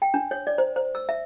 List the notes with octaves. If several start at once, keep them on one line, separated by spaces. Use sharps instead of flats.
G5
D4
C#5
D5
C5
C5
E6
E5